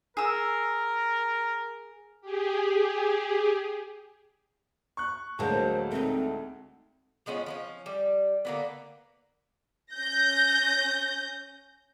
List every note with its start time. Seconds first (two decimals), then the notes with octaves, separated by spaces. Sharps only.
0.17 G#4 A#4 E6
2.21 G4 G#4
4.97 C#6 F#6
5.39 D2 F#3 G#3 A#3 C5 A5
5.92 A3 C4 D#4
7.26 F3 G#3 B3 C#4
7.46 F3 B3 C#4
7.86 G3
8.45 D3 A#3 B3
9.93 C#4 G6 A#6